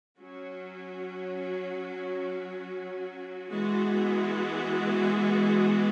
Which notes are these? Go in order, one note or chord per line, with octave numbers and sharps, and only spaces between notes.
F#3 C#4 F#4
E3 G#3 B3 F#4